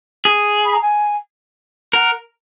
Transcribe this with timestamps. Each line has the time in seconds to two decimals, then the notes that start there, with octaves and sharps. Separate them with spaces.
0.25 G#4
0.65 B5
0.73 A#5
0.82 G#5
1.93 A#4 F#5